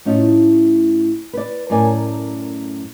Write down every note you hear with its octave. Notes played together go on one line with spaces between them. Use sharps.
A2 C#4 D#4 F4
B4 D5
F#2 A2 A#4 D5 G#5